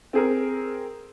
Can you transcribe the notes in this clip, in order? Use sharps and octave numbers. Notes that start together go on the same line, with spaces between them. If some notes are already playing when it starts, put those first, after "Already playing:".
C4 G#4 A#4